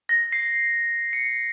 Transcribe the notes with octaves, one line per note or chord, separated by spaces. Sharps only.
A#6
C7
C#7